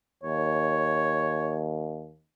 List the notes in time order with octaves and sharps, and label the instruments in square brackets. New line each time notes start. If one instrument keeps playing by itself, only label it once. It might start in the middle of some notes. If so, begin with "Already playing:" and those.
[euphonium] D#2 [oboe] C#5